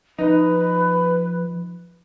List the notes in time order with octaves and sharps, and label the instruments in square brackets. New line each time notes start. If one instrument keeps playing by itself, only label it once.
[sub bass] F3 [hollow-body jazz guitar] D#4 [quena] B4